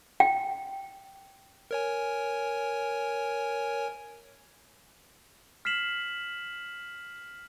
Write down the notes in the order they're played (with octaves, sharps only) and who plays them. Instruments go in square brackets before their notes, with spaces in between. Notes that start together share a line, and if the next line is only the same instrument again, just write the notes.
[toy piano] G5
[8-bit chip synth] A#4 C#5 G#5
[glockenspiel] F6 B6 C7 E7 F#7